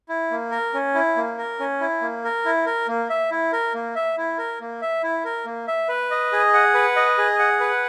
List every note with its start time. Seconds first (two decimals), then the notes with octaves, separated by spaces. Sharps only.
0.09 E4
0.31 A#3
0.51 A#4
0.74 C#4
0.95 E4
1.16 A#3
1.38 A#4
1.60 C#4
1.81 E4
2.02 A#3
2.24 A#4
2.45 E4
2.66 A#4
2.87 A#3
3.10 E5
3.31 E4
3.53 A#4
3.74 A#3
3.95 E5
4.18 E4
4.38 A#4
4.61 A#3
4.82 E5
5.03 E4
5.25 A#4
5.45 A#3
5.68 E5
5.89 B4
6.11 D#5
6.32 G#4
6.54 F#5
6.74 B4
6.96 D#5
7.18 G#4
7.39 F#5
7.60 B4